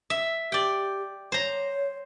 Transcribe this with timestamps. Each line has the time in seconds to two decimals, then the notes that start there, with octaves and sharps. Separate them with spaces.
0.10 E5
0.52 G4 D5 G5
1.32 C5 C#5 A#5